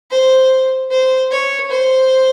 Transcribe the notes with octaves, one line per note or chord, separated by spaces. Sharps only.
C5
C5
C#5
C5